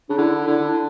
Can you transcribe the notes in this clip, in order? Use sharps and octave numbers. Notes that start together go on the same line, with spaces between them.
C#3 D4
D3 E4
D3 E4
D4